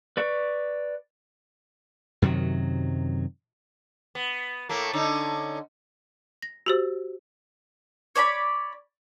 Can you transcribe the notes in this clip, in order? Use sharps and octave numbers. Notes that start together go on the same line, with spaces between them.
B4 D5 C#6
F#2 C3 D#3 F#3
B3
A2 A3 A#3
D3 C#4 D#4
A#6
F#4 G4 C5
C#5 D5 A5 B5